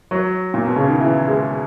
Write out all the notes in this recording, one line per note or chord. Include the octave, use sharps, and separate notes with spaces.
F#3
A#2
B2
C#3
D#3
E3
G#3